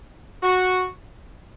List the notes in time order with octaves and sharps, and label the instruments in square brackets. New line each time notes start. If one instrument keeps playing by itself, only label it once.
[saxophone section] F#4